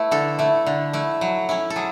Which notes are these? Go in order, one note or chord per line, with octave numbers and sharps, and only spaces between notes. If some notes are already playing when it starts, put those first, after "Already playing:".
Already playing: A3 E4 B4
D3 A4
A3 E4
D3
A3 E4
F#3
C#4 E4
A4
F#3 G#4